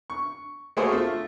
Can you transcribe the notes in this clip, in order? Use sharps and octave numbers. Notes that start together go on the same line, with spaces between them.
C#6
A3 A#3 F#4 G#4 C5 C#5
A3 F4